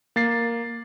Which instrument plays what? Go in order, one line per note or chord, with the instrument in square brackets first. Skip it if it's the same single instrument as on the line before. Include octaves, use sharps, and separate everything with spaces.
[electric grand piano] A#3 A6 C7